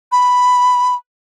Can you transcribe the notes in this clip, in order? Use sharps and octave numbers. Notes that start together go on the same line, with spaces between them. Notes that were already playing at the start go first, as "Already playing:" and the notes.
B5